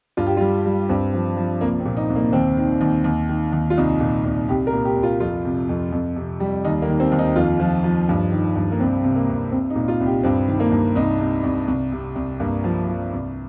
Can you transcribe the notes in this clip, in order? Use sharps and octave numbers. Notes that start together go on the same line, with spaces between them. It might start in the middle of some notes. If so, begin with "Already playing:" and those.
G2 F4
G4
G3 F4
G3
G2 C4
F3
F3
C2 A#3
C4
A#2
D#4
C2
A#3
D#2 C4
D#3
D#2
D#2
D#3
D#2
F4
C2 D#4
A#2
C2
C2 G4
A#4
A#2
G4
C2
F4
F2 F4
C3
F2
F2
C3
G3
D#2 D#4
A#3
D#3
C4
D#2
D#4
F2 F4
F3
F3
G2
D#3
G2
A#3
C2 C4
C3
A#3
C2
C2 C4
D#4
A#2
F4
C2
G4
G2 C4
D#3
A#3
G2
C2 D#4
C3
C2
C2
C3
C2
G2 A#3
F3
F3
C2